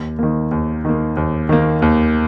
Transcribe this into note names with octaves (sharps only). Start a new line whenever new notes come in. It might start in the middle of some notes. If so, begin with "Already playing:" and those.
Already playing: D#2
D#3 A#3
D#2
D#3 A#3
D#2
D#3 A#3
D#2